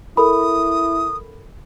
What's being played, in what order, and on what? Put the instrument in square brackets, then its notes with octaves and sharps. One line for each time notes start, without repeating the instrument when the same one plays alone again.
[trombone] E4 [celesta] A4 A#4 B5 [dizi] D#6